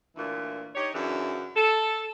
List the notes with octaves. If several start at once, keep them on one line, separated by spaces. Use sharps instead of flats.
D2 A#2 E3
D#4 G4 C#5
F#2 C#3 E3 D4
A4